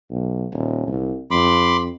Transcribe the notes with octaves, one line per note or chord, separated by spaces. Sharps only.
B1
D#1
C2
F2 B5 C6 D6